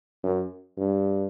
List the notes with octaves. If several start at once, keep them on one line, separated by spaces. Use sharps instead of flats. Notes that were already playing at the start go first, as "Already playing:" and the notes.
F#2
G2